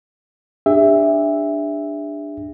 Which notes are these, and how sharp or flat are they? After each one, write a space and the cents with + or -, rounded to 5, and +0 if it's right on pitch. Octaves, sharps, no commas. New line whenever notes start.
D4 +10 G4 +45 E5 +0